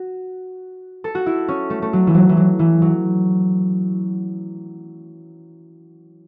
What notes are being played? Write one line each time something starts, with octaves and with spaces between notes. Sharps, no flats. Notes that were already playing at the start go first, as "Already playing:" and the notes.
Already playing: F#4
A4
F#4
E4
C#4
A3
A3
F#3
E3
F#3
E3
F#3
E3
F#3